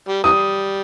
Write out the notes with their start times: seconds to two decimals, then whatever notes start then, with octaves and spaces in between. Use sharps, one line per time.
0.08 G3
0.24 C3 E3 G3 D#6